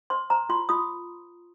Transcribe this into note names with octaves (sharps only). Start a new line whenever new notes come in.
C5 C6
C5 A#5
F4 C6
F4 D#6